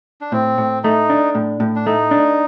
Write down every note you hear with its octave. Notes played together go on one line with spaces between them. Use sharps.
D4
A2 C4
A2
A3 D#4
D4
A2
A2
D4
A3 D#4
D4